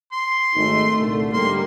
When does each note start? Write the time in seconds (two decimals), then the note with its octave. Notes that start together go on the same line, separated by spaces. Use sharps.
0.12 C6
0.56 G#1 G#3 A3 D#4
1.00 C2 A#2 D3
1.33 G#2 D3 G3 A#3 C6